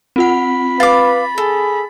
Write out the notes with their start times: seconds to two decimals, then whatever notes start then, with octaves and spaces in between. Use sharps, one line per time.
0.16 C4 F4 F#5 B5
0.80 B4 F5 D6 A6
1.38 G#4 A4